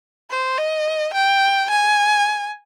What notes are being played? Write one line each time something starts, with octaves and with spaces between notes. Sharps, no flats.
C5
D#5
G5
G#5